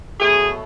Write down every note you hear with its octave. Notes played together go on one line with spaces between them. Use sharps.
B2 F#3 A3 G#4